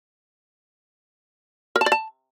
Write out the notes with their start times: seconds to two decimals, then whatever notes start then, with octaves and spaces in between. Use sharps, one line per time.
1.76 A#4
1.81 A5
1.86 D5
1.92 A5